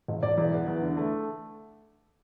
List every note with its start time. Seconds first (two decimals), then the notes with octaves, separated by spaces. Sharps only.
0.08 E1
0.23 E1 D5
0.38 E2
0.53 B3
0.68 E2
0.82 D3
0.97 A3